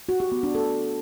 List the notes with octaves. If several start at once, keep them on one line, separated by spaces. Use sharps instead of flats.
F#4
G4
B3
D4
A4